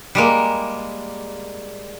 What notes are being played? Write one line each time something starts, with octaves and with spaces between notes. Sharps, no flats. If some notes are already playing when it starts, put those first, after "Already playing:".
G3 G#3 A#3